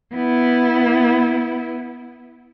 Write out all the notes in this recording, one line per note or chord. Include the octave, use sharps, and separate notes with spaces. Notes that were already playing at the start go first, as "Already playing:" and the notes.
B3 E4